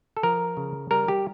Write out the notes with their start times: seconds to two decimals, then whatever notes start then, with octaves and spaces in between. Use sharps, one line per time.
0.17 A4
0.23 F3 A#4
0.57 C#3
0.91 G3 A#4
1.08 G4